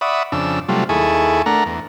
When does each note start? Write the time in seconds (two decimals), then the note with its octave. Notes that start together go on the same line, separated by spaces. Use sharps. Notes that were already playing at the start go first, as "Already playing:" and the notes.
0.01 D5 E5 F#5 B5 C#6 D#6
0.32 F2 C#3 D4 E6
0.69 C3 F#3 G3 A3 F4
0.89 D#2 E4 G#4 A4 G#5 C#6
1.46 A3 D4 A#4 F#5 A#5
1.66 E2